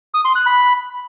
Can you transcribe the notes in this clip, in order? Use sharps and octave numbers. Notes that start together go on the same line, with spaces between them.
D#6
C6
F#6
B5